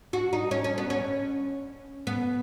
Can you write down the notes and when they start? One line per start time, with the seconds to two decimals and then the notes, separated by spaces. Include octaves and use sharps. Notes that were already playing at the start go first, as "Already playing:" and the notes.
0.13 F#4
0.33 D#4
0.51 C#4
0.64 C#4
0.78 B3
0.90 C#4
2.07 B3